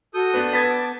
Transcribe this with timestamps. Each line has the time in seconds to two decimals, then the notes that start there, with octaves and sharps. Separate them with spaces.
0.14 F#4 A4 D#6 G6
0.34 B3 D4 B4
0.53 B3 A5 G#6 A6 B6
0.69 D6